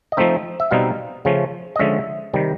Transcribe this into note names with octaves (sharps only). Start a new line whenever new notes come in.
D#5
F3 A3 C4 D#4 E5
E5
B2 G3 C4 D#4 F5
C#3 F3 A3 C#4
D#5
D3 F3 G#3 C#4 E5
C3 D#3 G3